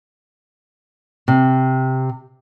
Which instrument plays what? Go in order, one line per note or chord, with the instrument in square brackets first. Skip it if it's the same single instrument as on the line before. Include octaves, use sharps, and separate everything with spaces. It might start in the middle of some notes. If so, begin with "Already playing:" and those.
[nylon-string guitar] C3